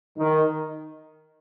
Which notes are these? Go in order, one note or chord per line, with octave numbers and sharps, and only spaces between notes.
D#3